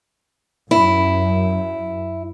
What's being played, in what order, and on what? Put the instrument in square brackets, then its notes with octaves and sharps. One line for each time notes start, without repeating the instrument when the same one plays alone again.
[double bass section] F#2 [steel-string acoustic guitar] E4